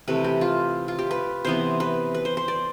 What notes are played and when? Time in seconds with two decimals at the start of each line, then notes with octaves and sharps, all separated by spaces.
0.08 C3 E3 A3 B4
0.24 G4
0.41 F4
0.88 F4
0.99 G4
1.11 B4
1.45 C3 E3 B3 C5
1.80 B4
2.15 B4
2.25 C5
2.37 C5
2.48 D5